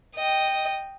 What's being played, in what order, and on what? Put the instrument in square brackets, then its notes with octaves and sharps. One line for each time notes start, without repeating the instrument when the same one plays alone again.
[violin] D#5 G5